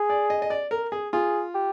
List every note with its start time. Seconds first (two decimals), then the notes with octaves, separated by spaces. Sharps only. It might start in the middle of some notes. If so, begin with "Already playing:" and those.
Already playing: G#4
0.10 D5
0.30 D#5
0.42 D#5
0.50 D5
0.71 A#4
0.92 G#4
1.13 F4 G#4
1.54 G4